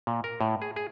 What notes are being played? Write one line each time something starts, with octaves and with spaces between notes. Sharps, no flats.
A#2
A#4
A2
G#4
G#4